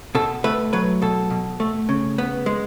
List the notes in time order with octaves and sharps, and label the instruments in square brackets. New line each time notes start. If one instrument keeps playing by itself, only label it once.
[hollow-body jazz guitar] B2 A4
A3 B4
F#3 B4
B2 A4
B2
A3
C#3
B3
G#3